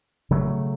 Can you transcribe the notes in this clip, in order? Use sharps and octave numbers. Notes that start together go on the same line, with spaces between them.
C#3 F#3 A3